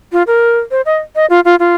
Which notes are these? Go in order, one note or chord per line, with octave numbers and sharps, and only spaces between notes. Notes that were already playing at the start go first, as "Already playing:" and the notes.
F4
A#4
C5
D#5
D#5
F4
F4
F4